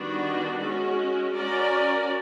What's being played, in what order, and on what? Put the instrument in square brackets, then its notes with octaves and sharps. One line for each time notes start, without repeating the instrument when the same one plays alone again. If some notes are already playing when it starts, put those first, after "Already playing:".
Already playing: [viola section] D#3 G3 B3 D4 F#4
G#3 C#4 F#4
C#4 F#4 A#4 D5